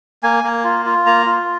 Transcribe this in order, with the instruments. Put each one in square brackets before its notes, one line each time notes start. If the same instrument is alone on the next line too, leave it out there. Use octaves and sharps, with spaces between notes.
[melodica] A#3 G#5
A#3
F4
F4
A#3 A#5
F4